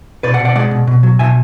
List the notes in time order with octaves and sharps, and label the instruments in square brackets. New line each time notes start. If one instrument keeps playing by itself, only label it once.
[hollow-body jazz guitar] B2 B4 D5
D5 F#5
B2
D5 F#5
G#3 D5 F#5
B2
B2
F#3
B2 E5 G#5